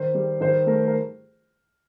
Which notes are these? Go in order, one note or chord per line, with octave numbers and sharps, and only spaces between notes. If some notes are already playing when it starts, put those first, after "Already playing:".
Already playing: D#3 C5
G3
D#3 C5
A3 A#4
A#4